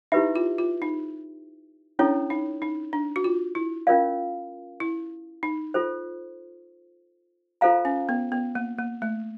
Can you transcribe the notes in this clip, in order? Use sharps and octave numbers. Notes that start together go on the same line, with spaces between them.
D#4 E4 G4 B4 E5
F4
F4
D#4
C#4 D4 E4 A4 C#5
D#4
D#4
D4
F#4
F4
E4
C#4 F4 A#4 D5 F5
E4
D#4
F4 A4 C5
F4 A4 C5 F5 A#5
C#4
B3
B3
A#3
A#3
A3